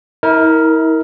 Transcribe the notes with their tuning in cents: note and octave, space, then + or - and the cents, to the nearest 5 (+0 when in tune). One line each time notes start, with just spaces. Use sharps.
E4 -40 A#4 +0